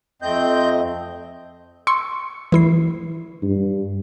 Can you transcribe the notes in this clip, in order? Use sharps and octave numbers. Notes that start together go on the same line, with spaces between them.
F2 A3 C4 D#5 G6
C6 C#6 E6 C#7
E3 E4 C7
G2